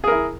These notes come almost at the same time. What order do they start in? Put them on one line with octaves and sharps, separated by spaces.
G#4 A#4 E4